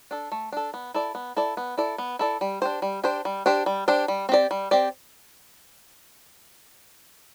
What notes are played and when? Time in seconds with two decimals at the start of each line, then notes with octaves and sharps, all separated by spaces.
0.11 D4 A4
0.32 A3
0.53 D4 A4
0.74 B3
0.94 E4 A4 D5
1.15 B3
1.37 E4 A4 D5
1.57 B3
1.77 E4 A4 D5
1.98 B3
2.19 E4 A4 D5
2.41 G3
2.62 D4 G4 C5
2.82 G3
3.04 D4 G4 C5
3.25 G3
3.46 D4 G4 C5
3.66 G3
3.88 D4 G4 C5
4.08 G3
4.29 C4 G4 D5
4.51 G3
4.71 C4 G4 D5